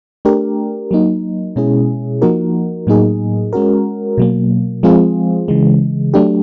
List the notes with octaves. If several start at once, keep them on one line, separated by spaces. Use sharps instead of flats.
A3 D4 G4 A#4
F#3 A#3 D#4
B2 G#3 C#4 E4 G#4
F3 A#3 D#4 F#4 A#4
A2 F#3 A#3 D#4 G#4
G#3 C#4 F#4 A#4
B2 F#3 A#3
F3 G#3 C4 F4 G#4
C#3 E3 G#3
F#3 A3 D4 G4